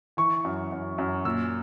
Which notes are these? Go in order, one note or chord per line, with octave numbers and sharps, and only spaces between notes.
E3 C#6
F#2
F#2
F#2
A#2 E6